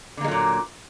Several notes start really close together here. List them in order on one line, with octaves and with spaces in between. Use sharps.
D3 A#3 G#3 F#3 A#2